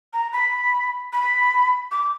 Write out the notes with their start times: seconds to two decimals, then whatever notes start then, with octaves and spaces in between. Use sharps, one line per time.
0.13 A#5
0.33 B5
1.13 B5
1.91 D6